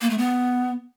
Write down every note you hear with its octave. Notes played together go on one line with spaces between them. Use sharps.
A#3
A3
B3